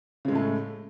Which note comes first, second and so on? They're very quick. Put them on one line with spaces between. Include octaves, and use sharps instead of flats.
C#3 G#3 A2 A3